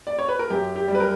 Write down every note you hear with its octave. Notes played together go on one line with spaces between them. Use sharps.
D5
C#5
B4
A#4
F#2 G4
G4
G3
B4
A#4